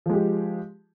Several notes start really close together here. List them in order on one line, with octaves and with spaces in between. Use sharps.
F3 G#3 G4